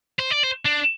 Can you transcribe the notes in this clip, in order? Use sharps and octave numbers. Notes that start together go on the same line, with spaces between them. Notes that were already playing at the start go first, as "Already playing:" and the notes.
C5
D5
C5
D4